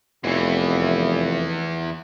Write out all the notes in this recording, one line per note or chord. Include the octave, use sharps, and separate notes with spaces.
F1 E2 E3